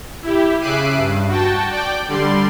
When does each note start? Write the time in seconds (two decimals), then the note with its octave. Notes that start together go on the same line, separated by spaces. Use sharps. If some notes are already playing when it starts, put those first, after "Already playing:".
0.22 E4 G4
0.60 C#3 E5 D6 F#6 C7 D#7
0.96 G2
1.28 F#4 G5 A5
1.70 D5 G5 D6
2.08 D3 G3 D5 C6